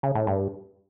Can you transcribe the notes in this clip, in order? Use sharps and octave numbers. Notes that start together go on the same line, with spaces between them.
C#3
A2
G2